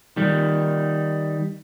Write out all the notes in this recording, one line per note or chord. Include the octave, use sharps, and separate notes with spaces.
D#3 G3